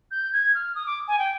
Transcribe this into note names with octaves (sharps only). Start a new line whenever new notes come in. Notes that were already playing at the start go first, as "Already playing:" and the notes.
G6
G#6
F6
D#6
D6
G#5
G5